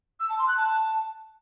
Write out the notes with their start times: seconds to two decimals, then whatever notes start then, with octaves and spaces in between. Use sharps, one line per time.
0.20 E6
0.29 A5
0.39 C6
0.48 F#6
0.57 A5